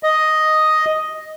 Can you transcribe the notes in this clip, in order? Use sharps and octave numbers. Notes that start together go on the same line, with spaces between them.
D#5